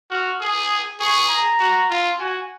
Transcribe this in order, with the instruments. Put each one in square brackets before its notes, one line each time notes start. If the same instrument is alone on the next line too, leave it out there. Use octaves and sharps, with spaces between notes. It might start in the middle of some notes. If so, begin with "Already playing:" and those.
[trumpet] F#4 [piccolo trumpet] F6
[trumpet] G#4 [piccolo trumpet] D#6
[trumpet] G#4 [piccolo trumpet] C#6
[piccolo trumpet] A#5
[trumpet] F#4
F4
[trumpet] F#4 [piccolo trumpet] G#5